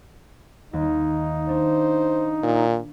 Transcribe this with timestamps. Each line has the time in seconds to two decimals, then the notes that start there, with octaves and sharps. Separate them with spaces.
0.73 D#2 D#4
1.49 D4 C5
2.43 A#2